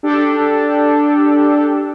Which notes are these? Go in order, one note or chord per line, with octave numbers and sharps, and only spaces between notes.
D4 G4 A4